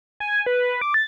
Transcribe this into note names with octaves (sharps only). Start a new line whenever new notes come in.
G#5
B4
D6
A6